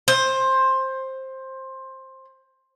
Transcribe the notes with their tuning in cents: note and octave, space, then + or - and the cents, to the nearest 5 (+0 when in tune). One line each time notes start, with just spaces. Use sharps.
C5 +15